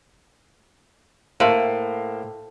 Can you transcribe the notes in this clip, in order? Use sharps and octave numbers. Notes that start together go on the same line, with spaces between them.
A2 A#3 C5 F5